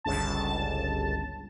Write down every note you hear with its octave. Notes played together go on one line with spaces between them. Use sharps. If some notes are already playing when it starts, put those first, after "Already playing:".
G1 C#2 A5